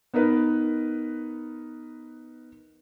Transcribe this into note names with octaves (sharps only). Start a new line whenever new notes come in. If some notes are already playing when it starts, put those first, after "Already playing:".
B3 D#4 A#4 B4